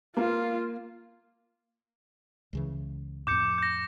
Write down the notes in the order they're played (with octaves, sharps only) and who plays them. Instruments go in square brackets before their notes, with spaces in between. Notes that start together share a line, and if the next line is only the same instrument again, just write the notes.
[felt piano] A#3 [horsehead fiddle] F4
[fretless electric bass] C#2 C#3 E3
[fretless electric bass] F2 A2 [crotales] D6 G6 C#7
[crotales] G6 A#6